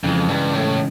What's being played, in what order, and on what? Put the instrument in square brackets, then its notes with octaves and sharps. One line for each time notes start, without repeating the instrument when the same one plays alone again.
[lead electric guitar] F2 [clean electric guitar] C#3 E3 G#3
[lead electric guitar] G2
A2